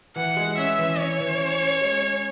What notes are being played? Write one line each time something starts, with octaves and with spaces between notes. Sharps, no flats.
E3 F#5
G#3
C#4 E5
E3
C#4 C#5
E3
C#4
C#4
G#3
C#4